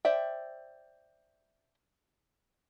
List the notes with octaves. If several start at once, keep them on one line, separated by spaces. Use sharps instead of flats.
C5 D5 E5 G5